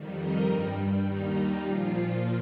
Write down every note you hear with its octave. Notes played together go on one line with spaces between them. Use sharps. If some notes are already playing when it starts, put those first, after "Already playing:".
Already playing: F2 D#3 G3
A#4 D#5
G2 G3
D#2 D#3 G3 D#4
A#2 F3 F4